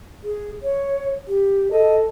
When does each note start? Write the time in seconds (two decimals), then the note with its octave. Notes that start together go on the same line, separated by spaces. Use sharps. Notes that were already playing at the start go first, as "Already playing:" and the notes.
0.24 G#4
0.63 C#5
1.28 G4
1.71 A4 D#5